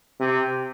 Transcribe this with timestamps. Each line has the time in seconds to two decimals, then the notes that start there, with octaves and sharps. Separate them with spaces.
0.20 C3